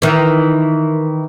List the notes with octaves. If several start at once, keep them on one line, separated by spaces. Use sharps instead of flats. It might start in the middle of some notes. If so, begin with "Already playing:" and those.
D#3 E3